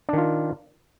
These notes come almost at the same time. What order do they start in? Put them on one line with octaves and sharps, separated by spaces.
D4 D#3 F4